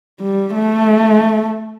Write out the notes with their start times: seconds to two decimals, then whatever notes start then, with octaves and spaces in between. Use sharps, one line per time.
0.21 G3
0.54 A3